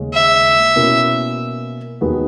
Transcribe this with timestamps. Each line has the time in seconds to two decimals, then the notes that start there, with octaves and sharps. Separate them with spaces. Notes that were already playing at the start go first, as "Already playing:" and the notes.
Already playing: D#2 C#3 G#3 C#4
0.14 E5
0.76 B2 A#3 C#4 E4
2.01 D#2 D#3 G#3 B3 F#4